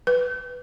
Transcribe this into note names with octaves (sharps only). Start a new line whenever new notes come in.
B4